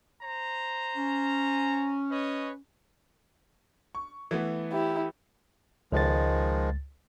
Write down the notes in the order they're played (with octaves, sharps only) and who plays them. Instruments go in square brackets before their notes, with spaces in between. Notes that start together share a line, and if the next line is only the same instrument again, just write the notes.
[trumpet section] C5 A#5
[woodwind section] C#4
[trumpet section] B4 C#5 D#5
[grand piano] C#6
E3 A3 B3
[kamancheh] E4 G4
[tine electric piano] C#2 A6 [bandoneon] D#3 F3 G#3